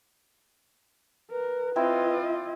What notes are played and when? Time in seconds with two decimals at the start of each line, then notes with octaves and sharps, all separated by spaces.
1.31 A#4 B4
1.76 C4 E4 F4 D#5